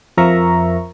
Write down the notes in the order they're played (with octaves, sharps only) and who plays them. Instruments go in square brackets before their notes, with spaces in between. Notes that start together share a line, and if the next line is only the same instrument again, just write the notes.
[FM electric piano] F2 F3 A#4 E5 A#5 C#6